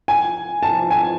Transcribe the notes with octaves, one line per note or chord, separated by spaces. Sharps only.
G#5
A5
G#5